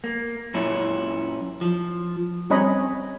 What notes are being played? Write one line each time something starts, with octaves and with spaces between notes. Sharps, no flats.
A#3
F#2 A#2 C#4 E4
F3
G3 C4 C#4 C#5 D#5 B5